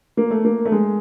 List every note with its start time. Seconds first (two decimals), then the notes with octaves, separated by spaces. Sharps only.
0.17 A#3
0.31 A3
0.45 A#3
0.65 A3
0.72 G#3